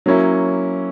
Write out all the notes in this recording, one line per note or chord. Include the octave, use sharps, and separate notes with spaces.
F#3 A#3 C#4 E4